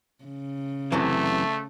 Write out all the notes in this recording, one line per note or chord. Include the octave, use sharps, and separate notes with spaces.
C#3
F#2 C3 E3 A3